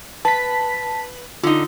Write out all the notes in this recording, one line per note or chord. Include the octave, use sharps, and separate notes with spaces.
B4 A5 B6
D3 D#4 F4